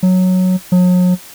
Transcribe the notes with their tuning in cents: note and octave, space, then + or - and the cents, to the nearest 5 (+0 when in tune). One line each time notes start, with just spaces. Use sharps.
F#3 -5
F#3 -40